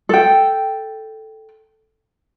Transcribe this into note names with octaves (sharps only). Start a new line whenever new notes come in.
A4 G5